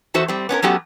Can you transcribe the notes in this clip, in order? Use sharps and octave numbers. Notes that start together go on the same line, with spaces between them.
E2 F#4 A4 C5 E5
G3 C4
B3 C#4 D4 A#4
F#3 A3 B3 C#4 F#4 G4